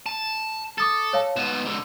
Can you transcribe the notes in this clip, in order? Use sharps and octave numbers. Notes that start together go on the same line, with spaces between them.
A5
A4 D6 D#6 A6
C#5 F5 A5
G#2 B3 E7
G#2 D3